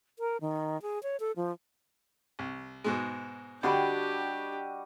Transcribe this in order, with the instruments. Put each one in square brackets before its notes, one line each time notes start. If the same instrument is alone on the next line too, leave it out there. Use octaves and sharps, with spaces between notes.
[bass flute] A#4
D#3
G#4
C#5
A4
F3
[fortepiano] C2
G#2 B2 G#3
[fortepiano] D3 [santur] G3 F#4 D#5 [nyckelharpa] D4 G4 [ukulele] G5 B5